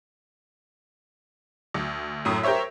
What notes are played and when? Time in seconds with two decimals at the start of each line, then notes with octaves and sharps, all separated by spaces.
1.74 D2
2.25 F#2 A2 D#6
2.43 G4 A#4 C5 C#5 E5